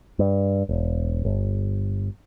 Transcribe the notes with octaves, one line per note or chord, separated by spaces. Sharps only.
G2
E1
G1